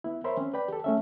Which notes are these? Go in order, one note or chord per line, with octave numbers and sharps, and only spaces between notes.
B3 E4
A#4 C5 C#5 E5 B5 C6
C4 C#4
B4 D5 G5 B5
G4 A4
A3 C#4 E5